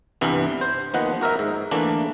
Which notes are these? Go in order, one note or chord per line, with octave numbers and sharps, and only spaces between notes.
C2 G2 E3 B3
C5
D#2 D#3 F3 B3 D#5 F#5
F#4 A#4 D#5 E5
G#2
D3 E3 A3 A#3 D4